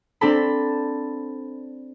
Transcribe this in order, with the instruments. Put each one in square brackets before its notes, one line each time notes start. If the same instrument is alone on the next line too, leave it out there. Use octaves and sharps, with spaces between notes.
[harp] C4 D4 A4 A5 B5